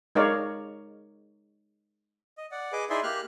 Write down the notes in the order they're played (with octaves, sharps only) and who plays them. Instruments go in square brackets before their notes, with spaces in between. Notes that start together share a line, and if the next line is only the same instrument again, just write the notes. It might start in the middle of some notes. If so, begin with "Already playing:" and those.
[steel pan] G#3 D#4 A#4 C#5 D5 F5
[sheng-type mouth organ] D#5
D5 F#5
G#4 B4 D#5 D6
D#4 E4 G#4 D5 E5 C6
A#3 G4 F6 F#6